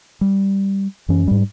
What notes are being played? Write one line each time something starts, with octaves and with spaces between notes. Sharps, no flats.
G3
F#2 E3 C#4
G#2 G3